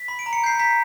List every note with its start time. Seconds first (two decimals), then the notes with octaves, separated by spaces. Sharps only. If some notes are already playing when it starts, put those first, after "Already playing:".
Already playing: B6
0.08 B5
0.19 D7
0.26 A#5
0.33 C#7
0.44 G6 C7
0.60 A#5 B6